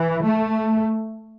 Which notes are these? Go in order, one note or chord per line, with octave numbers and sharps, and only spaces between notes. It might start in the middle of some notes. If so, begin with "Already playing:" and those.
Already playing: E3
A3